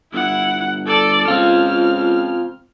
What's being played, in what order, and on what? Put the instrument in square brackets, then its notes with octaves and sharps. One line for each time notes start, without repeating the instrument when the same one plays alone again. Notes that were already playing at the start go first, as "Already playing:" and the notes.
[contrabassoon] G1 [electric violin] E4 F#5
[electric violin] A4 D5
[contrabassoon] C#2 [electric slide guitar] C4 F4 [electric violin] F6